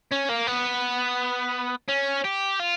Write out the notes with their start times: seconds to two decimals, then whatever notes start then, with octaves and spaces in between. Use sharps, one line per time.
0.11 C#4
0.29 A#3
0.47 B3
1.88 C#4
2.24 G4
2.59 F4